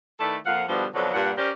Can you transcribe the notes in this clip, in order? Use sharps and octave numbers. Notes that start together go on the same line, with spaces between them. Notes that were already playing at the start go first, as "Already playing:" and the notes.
D#3 A3 E4 A4 B4 D5
F2 A#2 F3 F5 F#5
G2 B2 D3 F3 G3 B3
F2 B2 D3 F3 F#3
G2 A#2 F#5
C#4 G4 A#4 C5 D5